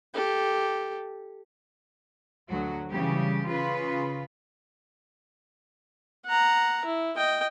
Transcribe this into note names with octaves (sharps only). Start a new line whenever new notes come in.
G4 A4
D2 F#3 F#4
C#3 E3 G3 G4
C#3 F4 B4
F#5 A#5
E4
D#5 G5